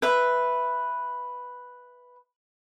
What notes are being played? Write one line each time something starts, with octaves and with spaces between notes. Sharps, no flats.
B4 E5